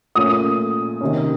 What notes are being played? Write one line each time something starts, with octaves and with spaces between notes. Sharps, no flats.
A#2 A3 C#4 D#6
C3 D#3 A#3 C#4